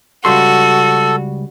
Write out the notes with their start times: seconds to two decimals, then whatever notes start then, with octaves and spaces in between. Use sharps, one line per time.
0.25 C#2 G3 F#4 A4 C6